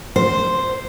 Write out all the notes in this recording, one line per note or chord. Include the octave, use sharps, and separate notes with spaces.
C5